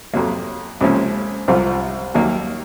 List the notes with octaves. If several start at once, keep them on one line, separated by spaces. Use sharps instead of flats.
F2 C3 F#3 A#3
C#2 C3 F3 A#3 C#4
C2 C3 F3 C4 F4
D#2 D#3 F#3 A#3